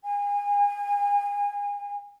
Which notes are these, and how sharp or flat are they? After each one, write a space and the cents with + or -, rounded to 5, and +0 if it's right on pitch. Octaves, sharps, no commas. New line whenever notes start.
G#5 -30